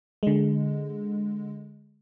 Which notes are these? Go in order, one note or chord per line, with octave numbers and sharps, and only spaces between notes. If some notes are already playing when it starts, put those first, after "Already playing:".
D3 G#3